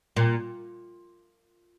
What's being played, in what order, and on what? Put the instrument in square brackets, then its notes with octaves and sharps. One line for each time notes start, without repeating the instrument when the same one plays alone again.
[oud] A#2